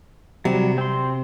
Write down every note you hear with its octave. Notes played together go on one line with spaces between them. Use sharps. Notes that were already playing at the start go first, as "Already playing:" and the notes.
C3 F#3 G3
C4 C6